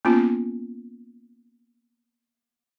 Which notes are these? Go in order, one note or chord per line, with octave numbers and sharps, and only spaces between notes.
A#3 B3 C#4 F4